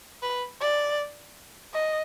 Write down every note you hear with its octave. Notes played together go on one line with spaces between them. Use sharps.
B4
D5
D#5